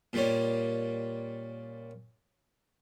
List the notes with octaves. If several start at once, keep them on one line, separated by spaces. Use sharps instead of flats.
A#2 G3 C#4